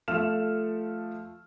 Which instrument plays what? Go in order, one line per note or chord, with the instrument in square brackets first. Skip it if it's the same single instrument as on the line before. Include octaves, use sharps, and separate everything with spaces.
[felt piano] F3 A3 A4 F5 F6 E7